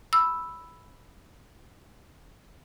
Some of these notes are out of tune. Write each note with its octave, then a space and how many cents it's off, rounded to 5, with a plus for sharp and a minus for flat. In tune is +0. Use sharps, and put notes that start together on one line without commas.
B5 +0 E6 +0